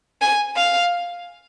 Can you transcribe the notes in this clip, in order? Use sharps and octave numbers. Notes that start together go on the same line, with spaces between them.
G#5
F5